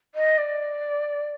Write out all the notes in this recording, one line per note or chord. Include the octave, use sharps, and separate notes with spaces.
D#5
D5